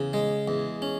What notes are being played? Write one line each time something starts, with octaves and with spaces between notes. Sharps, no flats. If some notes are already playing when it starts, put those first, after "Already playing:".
Already playing: E2 C#3
G#3
E2
C#4